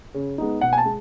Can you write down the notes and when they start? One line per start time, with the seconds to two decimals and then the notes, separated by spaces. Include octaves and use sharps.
0.14 C#3
0.38 G#3 B3 D#4
0.61 B2 F#5
0.73 G#5
0.78 A5
0.85 G#3